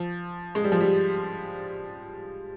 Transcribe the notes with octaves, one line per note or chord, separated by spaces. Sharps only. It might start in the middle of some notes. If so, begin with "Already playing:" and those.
Already playing: F3
G#3
G3
F3
G3